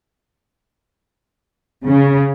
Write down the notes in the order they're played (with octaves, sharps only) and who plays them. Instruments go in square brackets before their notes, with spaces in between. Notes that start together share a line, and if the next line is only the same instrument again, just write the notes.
[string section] C#3